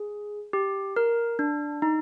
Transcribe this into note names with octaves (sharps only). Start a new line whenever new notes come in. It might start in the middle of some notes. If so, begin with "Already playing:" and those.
Already playing: G#4
G4
A#4
D4
D#4